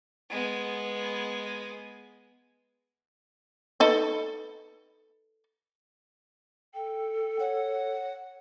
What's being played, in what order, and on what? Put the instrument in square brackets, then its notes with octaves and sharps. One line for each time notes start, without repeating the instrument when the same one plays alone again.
[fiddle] G#3 B3
[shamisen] D#4 A4 B4
[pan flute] A4 [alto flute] G5
[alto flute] C#5 [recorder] F#5